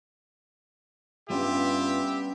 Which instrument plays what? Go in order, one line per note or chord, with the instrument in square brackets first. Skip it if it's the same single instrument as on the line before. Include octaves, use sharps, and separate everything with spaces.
[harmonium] G2 F4 [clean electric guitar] G3 B3 C#4 [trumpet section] G4 E5